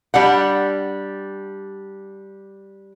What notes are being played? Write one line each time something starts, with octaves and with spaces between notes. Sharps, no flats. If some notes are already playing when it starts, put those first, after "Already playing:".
G3 D4 F#5